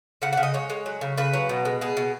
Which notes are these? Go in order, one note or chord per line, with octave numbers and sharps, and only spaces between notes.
C#3 F#5
F#5
C#3
D#5
G#3 C#5
G#3
F#3
C#3
C#3 B4
F#3
B2
G#3
B2 G#4
B2